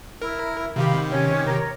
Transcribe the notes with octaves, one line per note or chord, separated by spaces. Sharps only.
E4 A#4
C3 D#3 G4 F5 B5
C#4
A#4 C#5